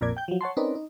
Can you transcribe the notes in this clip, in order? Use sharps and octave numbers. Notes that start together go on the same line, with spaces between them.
A#1 F2 A#2 A#4 D5 G#6
G5 G6
F3 F#3
C#5 F#5 A5 C6
C4 C#4 D#4 A#4 B4 D5
D#4